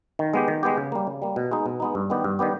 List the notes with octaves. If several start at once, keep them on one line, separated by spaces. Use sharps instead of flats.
D#3
G#3 B3 G4
D#3
G#3 B3 G4
C#3
G3 A#3
C#3
G3 A#3
B2
G#3 B3 D#4
B2
G#3 B3 D#4
G2
D#3 G3 B3 G4
G2
D#3 G3 B3 G4